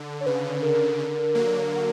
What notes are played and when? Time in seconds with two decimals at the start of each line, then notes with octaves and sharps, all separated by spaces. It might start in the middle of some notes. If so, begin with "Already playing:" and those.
Already playing: D3
0.21 C#5
0.26 C#3 B4
0.63 A#4
0.99 D3
1.35 F#3 A#3